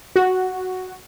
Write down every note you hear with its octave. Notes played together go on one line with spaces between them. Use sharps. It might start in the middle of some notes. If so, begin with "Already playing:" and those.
F#4